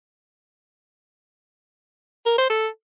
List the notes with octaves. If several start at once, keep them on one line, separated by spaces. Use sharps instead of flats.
A#4
C5
A4